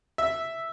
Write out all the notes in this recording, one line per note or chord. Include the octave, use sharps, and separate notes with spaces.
E5